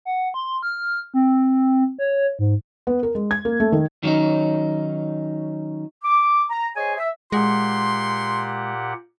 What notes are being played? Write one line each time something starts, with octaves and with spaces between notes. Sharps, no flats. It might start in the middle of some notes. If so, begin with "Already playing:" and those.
F#5
C6
F6
C4
C#5
G#2
B3
A#4
G#3
G#6
A#3
A3
D#3
D#3 F#3 G3 C#4 D#4
D6
A#5
G#4 C5 C#5 D#5 G#5
E5
A#2 G#3 G4 F#5 C6